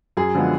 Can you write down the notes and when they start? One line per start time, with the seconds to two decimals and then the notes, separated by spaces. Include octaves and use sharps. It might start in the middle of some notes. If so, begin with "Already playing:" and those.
0.17 F#2 G#4
0.35 D3 F3 G#3 B3